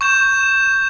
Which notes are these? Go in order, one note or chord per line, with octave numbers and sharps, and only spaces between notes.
C#6 G6 E7